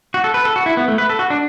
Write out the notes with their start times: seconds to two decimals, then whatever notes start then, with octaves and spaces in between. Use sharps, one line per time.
0.14 F#4
0.24 A4
0.34 B4
0.45 A4
0.56 F#4
0.66 E4
0.77 B3
0.88 A3
0.98 B4
1.09 A4
1.19 F#4
1.30 D4